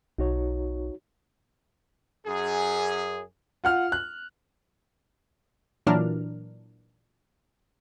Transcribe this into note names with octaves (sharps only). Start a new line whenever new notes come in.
B1 D#4 F#4 C#5
F#2 G#4
F4 F#5 F6
F#6
A#2 E3 F#3 D4 A#4 F6